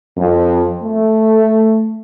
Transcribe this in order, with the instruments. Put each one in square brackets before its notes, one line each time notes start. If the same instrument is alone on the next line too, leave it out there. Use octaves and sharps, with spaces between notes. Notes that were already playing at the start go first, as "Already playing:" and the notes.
[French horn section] F2
A3